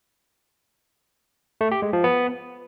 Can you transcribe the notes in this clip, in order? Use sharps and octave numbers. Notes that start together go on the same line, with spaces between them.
A3
G4
G#3
F3
B3